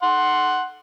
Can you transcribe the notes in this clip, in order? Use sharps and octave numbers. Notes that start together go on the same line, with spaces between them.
F#5 C6